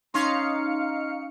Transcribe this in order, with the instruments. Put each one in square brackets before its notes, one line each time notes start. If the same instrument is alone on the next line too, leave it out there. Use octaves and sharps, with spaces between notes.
[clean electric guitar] C#4 C6 [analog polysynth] D#4 F5 C#7